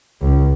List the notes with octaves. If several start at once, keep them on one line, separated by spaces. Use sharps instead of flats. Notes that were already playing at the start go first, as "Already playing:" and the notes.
C#2